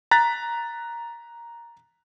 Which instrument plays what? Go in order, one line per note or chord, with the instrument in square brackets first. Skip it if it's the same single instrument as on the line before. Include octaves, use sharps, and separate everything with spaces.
[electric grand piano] A#5 F#6 A6 B6